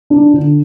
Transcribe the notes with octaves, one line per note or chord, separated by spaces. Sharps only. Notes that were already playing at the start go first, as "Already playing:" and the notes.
D4
D3